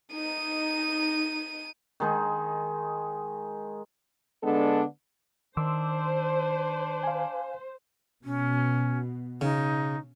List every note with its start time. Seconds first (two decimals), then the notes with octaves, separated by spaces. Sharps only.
0.14 D#4 D#7
2.00 D#3 G#3 D#4
4.43 D3 G#3 B3 D4 A4
5.57 D#3 D4 C5 C6 D6 E6
7.03 F5 G#5
8.24 B2 C#4
9.41 C#3 D#4